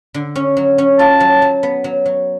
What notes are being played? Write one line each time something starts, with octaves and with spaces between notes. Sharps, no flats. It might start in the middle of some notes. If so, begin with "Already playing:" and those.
D3
C#4
F#3
C#4
F4 A5
F#3
F#3
B3
F#3
F#3